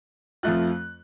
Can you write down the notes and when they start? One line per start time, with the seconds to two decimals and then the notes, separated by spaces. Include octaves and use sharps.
0.43 F2 F3 A3 F4 F#6